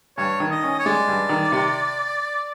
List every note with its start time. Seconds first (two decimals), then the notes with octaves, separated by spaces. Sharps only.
0.18 G2 C#5
0.40 D#3
0.51 D#5
0.63 C#4
0.79 C#5
0.86 G#3 D5
1.08 G2
1.29 D#3
1.52 C3